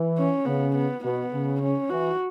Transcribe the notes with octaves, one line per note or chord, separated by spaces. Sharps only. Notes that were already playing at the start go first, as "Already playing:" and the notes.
Already playing: E3
C#4
C#3 B3
B3
B2 B3
C#3
C#4
E3 F#4